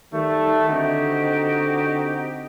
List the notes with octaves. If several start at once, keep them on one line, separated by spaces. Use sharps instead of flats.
D#3 G3 A3
D3 C4 D#4 F#4 G4